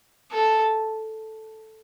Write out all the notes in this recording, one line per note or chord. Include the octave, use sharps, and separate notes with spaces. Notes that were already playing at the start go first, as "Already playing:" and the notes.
A4